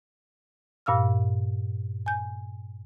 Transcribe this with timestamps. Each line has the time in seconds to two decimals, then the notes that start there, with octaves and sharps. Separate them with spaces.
0.86 G2 A#2 F5 E6 F6
2.06 G#5 G6